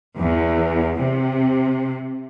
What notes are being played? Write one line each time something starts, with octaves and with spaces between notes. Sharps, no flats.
E2
C3